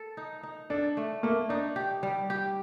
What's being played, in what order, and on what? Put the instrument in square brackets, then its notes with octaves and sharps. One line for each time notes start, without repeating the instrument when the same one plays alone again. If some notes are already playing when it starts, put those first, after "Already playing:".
Already playing: [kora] A4
D#4
D#4
[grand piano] D4 [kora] A4
[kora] A3
[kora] A3 [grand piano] A#3
[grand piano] D4 [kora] D#4
[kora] G4
G3
G4